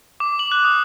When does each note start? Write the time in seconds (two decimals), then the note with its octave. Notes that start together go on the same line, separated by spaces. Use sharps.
0.20 D6
0.39 F#7
0.52 F#6
0.64 D#6